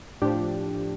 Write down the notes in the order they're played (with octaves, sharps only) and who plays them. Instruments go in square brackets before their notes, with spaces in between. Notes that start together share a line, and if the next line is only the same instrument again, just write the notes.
[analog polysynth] A2 F3 D4 G4